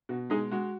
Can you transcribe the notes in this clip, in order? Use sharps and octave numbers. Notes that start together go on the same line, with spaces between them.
B2 F#4
G#3 D#4 G#4
G#3 F#4